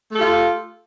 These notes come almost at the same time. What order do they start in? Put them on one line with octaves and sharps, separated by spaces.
A3 A4 G4 F4